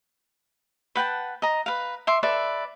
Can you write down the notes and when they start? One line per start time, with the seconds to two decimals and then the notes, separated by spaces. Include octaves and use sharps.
0.95 B4 F#5 G5 A5
1.42 D#5 A#5
1.66 B4 F5
2.07 E5 C6 D6
2.23 A4 B4 D5 E5